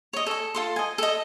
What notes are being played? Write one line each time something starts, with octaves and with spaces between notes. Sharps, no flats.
C#5 D#5
A4 G#5
F4 A4 C6
D#5 G#5
A4 D#5